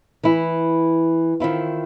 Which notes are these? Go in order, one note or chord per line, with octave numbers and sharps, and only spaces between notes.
E3 E4
D#3 C4 E4 F4